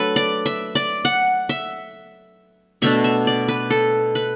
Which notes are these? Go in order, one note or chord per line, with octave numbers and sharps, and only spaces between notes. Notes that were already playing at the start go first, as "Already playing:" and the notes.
Already playing: F#3 A3 D4 A4 B4
D5
E5
D5
F#5
E5
B2 A3 D4 E5
E5
D5
B4
A4
B4